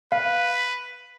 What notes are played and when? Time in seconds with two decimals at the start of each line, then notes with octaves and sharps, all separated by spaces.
0.12 B4 F5